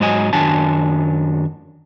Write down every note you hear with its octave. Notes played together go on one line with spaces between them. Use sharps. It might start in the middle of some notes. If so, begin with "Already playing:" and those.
G#2 F#3 D#5 G#5
F#2 D#3 F#3 D4 G#5 A5